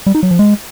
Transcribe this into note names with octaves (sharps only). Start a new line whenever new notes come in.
G3
D#4
F#3
F3
G#3